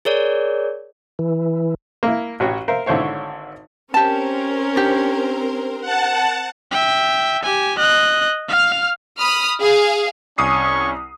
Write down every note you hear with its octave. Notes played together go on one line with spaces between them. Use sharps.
G#4 A#4 C#5 D5
E3
A#3 E4
A1 F#4 C#5 G5
A#4 C5 E5 F5
G#1 D3 E4 C5 C#5 F5
C4 C#4 G4 A#4 C5 A5
D4 G4
F#5 A5
E5 G5
G4 G#5
D#5 F#6
F5 F6
B5 D#6 F6
G#4 F5
C2 C#4 G#5 C#6 D#6 C7